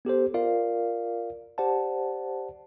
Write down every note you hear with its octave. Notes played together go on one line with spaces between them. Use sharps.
B3 G4 A4 C5
F4 A#4 D5 F5
G4 C5 D5 F#5 A5